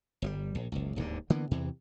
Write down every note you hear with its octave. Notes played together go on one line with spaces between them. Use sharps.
G1 E3 G3
A#1
F#1 C#2
D1 D#2 G#2 D3
D3 E3 A#3 B3
E2 C3 E3